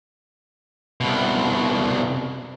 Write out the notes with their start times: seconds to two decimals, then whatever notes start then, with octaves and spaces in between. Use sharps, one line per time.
1.01 C2 B2